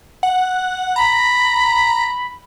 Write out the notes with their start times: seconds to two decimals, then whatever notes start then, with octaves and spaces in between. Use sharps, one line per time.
0.23 F#5
0.96 A#5 B5